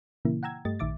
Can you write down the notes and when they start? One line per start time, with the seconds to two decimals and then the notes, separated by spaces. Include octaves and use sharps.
0.25 A#2 C#3 E3 A#3 E4
0.43 F#5 G5 A#5 E6 G#6
0.65 G2 A3 G4 D#5 A6
0.79 A#1 D#3 E5 D6 A6